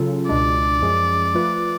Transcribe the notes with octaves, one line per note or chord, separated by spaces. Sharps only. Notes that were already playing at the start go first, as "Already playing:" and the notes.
Already playing: C#3 F#3 C#4 F4 A4
C#2 B2 G#3 D4 D5
F#2 F3 G#3 C#4 G#4
F3 A3 F4 B4